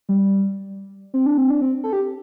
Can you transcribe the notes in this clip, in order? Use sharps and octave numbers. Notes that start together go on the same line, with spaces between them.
G3
C4
D4
C4
D4
C4
A4
G4